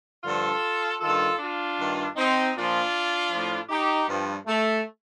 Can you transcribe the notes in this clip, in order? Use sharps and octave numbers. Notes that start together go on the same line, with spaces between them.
G2 D3 F3 F4 A4
G2 D#3 F4 A4
D4 F4
G2 D#3
C4 D#4
A#2 F3 D4 F4
A2 F3
D#4 G4
G2 F3
A3